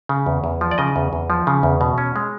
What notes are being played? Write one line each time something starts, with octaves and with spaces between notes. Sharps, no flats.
C#3
E2
E2
F3
D5
C#3 D#5
E2
E2
F3
C#3
E2
B2
C#4
G#3